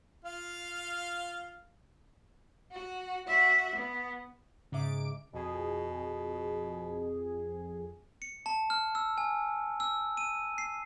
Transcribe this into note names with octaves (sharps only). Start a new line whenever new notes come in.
F4 F5
F#4
F#4 E5
B3
G#2 C#3 E5 D6 D7
F2 B2 G#4
C#7
A5
F6
E6
G#5
E6
D#7
C7